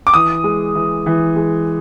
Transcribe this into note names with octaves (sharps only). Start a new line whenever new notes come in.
D6
E3 D#6
G#3
E3
E3
G#3